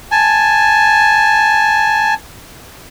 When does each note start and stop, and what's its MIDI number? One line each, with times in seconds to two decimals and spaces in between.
0.12 2.14 80
0.12 2.14 81